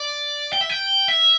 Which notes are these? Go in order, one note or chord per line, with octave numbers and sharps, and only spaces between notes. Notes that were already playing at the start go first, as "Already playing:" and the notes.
Already playing: D5
G5
E5
G5
E5